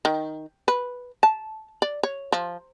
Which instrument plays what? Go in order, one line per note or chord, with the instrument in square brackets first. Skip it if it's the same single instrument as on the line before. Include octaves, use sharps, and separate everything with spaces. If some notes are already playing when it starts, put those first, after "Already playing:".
[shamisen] D#3
B4
A5
D5
C#5
F3